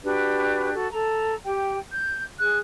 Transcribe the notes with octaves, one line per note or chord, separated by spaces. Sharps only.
D4 F#4 G4 B4
F#4 A4
A4 A#5
G4 G5
G6
G#4 F#6